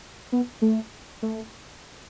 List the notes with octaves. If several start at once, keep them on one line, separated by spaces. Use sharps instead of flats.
B3
A3
A3